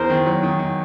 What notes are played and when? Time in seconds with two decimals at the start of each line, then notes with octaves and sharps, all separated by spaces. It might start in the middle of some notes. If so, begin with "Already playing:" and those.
Already playing: E2 A#4 C5
0.10 D#3
0.26 F#3
0.43 D#3
0.59 D#3